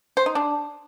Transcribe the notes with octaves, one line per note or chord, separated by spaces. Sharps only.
C5
D#4
D4